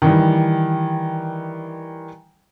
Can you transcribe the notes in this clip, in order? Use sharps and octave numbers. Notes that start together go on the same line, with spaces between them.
D#3 E3 G3